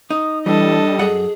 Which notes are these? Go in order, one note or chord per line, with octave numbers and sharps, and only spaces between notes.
D#4 D#6
E3 G3 D4 A4 D#5
F#2 G#4 F#5